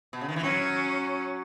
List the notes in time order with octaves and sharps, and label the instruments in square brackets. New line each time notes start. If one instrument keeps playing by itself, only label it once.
[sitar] B2
C#3
D#3
E3
[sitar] F#3 [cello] C#4